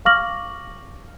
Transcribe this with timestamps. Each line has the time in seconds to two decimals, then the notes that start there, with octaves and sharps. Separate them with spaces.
0.05 F5 C#6 D6 F6 A#6 F#7